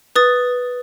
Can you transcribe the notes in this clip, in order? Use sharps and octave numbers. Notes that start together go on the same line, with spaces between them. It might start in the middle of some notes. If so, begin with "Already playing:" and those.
B4 D#6 A6